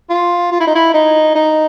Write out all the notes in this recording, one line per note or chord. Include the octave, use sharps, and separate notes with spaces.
F4
F4
E4
D#4
E4
D#4
D#4